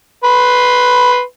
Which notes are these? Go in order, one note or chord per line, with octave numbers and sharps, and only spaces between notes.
B4 C6